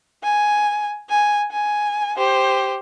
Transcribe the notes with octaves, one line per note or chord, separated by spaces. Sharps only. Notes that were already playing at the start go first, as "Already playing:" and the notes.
G#5
G#5
G#5
G4 C5